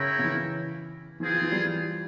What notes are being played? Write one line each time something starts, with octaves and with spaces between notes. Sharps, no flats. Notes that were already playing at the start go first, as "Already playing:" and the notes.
Already playing: C#3 E4 A#4 C#5 E5 G5
C#3
E3
E3 C4 F4 G#4
F3
E3
G3